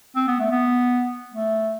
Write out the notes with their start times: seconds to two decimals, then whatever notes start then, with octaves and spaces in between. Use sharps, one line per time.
0.16 C4
0.28 B3
0.40 A3
0.51 B3
1.34 A3